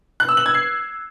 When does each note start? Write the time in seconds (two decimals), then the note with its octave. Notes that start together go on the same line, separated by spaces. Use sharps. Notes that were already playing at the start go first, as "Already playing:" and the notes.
0.20 F#6
0.29 E6
0.37 F#7
0.46 G#6
0.54 C7